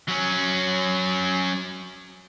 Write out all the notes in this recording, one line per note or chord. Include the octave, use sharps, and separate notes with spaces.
F#3 C#4